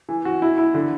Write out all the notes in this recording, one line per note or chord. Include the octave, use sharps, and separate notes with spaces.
E3
F#4
E4
E4
D3